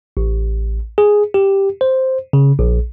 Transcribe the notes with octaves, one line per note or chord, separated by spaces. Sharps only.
A1
G#4
G4
C5
C#3
A#1